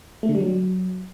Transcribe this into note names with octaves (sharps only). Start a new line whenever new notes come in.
A3
D3
G3
F#3